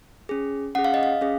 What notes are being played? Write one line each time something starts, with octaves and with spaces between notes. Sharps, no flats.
C#4 G#4
C#4 G#4 F#5
F5
D#5
F5
C#4 G#4